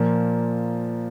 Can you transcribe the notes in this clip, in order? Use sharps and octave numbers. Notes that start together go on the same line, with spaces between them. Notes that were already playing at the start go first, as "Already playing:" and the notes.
Already playing: A#2 F3 A#3